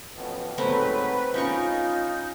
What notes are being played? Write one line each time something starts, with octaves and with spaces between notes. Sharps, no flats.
A1 F2 B2
G#2 F#3 A3 C4 B4
C#4 D#4 F4 G5 C#6